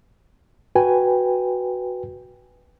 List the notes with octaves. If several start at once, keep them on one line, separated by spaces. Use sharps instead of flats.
F#4 B4 G5 G#5